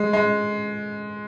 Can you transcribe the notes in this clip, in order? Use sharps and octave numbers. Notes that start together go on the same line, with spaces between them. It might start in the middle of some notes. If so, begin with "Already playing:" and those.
Already playing: G#3
G#3